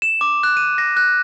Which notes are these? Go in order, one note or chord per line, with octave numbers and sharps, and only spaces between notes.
E7
D6
F#6
D#7
A#6
F#6